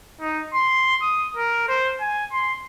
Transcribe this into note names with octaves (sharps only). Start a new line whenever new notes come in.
D#4
C6
D#6
A#4
C5
G#5
C6